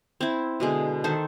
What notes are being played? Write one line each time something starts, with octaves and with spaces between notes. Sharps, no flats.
C4 E4
B2 D3 G#3
D#3 A4 C5